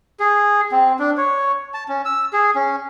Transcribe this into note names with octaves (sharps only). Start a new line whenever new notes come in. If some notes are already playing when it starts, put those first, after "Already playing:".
G#4
C4
D4
C#5
A5
C#4
E6
G#4
C#4